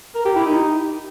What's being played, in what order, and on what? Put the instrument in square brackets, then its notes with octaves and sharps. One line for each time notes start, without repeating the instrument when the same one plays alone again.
[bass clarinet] A#4
G4
E4
D#4